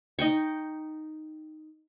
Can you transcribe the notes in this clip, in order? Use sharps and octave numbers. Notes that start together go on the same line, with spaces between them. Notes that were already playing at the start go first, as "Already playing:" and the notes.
D#4 D#5 G5 C#6